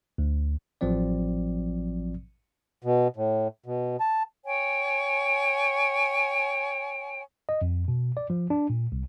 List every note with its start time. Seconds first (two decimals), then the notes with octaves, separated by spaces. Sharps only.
0.18 D2
0.81 A1 F3 F#3 C4 D5
2.83 B2
3.17 A2
3.66 B2
4.00 A5
4.45 C#5 G5 G#5
7.49 D#5
7.62 F2
7.88 B2
8.17 D5
8.30 F3
8.50 D4
8.70 A#2
8.92 C2